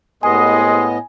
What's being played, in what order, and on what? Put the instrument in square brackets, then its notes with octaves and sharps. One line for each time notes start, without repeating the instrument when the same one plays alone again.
[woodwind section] C2 C6 D#6 [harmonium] A2 B3 D#5 [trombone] G#3 [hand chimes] G#5